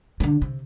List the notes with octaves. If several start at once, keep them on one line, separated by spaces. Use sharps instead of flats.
E3
D3
C3